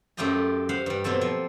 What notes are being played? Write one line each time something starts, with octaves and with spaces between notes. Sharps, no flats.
F#2 A3 F4 G4 D#5 A#5
C5 F5 F#5 B5
G2 G3
B2 F#3 A#3 C4 A4
F3